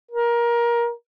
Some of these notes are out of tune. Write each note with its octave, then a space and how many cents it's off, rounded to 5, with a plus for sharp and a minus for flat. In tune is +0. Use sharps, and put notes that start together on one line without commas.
A#4 +20